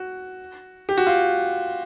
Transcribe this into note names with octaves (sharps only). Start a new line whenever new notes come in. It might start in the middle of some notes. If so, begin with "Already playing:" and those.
Already playing: F#4
G4
F#4
F4